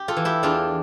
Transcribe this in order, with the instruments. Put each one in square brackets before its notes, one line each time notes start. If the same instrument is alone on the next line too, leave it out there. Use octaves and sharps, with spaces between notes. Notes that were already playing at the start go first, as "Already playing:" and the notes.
Already playing: [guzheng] G4
F4 A4
E3
E4 G4
E2 D4 F4